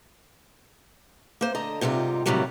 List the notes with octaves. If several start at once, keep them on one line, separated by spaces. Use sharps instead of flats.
A#3 C5
D3 D#5 A#5
G#2 C3 G3 D#4 F4
A2 C3 D#3 F#3 G3 A#3